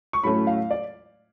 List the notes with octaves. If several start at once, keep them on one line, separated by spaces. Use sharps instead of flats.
C#6
A2 F#3 A3 C#4 B5
F5
D5